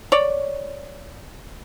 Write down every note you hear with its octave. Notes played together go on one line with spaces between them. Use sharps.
C#5 D5